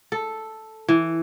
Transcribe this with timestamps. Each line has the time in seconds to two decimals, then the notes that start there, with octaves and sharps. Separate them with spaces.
0.12 A4
0.89 E3